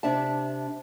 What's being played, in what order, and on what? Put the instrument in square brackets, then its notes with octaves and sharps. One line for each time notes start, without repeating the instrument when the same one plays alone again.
[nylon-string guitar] C3 D4 E5 A5